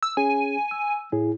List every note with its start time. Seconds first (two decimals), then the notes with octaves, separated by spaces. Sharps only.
0.03 E6
0.17 C#4 G#4 G#5
0.71 E6
1.12 A2 G#4